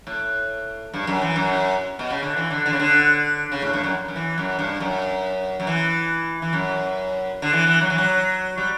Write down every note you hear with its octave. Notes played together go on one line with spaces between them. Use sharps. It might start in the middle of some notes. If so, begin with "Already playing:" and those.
A2
G2
F#2
E3
F#2
B2
C#3
D3
E3
D3
D3
C#3
D3
C#3
A2
G2
F#2
F#2
E3
F#2
G2
F#2
F#2
E3
E3
F#2
D3
E3
E3
F#3
E3
F#3
G3